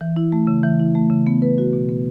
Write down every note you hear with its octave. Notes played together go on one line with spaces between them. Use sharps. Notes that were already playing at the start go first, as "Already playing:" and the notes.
E3
E4
A3
C#3
E3
E4
A3
C#3
B3
B4
F#4
B2
B3